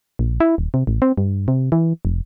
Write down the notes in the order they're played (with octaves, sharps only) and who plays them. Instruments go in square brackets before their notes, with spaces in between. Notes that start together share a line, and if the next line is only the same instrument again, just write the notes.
[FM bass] A#1
E4
D#1
C3
A1
C4
G2
C3
E3
F1